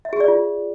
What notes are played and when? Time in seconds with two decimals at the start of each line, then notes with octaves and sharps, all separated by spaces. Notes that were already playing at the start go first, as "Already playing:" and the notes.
0.05 E5
0.13 G#4
0.20 D5
0.28 F4